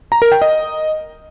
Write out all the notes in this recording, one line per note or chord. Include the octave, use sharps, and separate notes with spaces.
A#5
A#4
G5
D#5